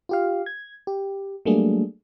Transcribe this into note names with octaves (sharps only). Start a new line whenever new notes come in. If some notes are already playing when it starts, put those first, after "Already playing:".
F4 G4 F5
G#6
G4
F#3 G3 A3 A#3 D4 G#4